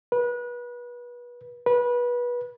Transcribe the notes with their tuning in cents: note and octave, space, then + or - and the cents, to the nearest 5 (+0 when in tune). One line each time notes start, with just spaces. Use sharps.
B4 -30
B4 -25